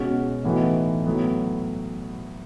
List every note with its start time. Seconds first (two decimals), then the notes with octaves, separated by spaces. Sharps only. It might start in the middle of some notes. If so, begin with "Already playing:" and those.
Already playing: B2 G#3 C#4 F#4
0.44 A2 E3 B3 D#4 F#4
1.06 A2 F#3 B3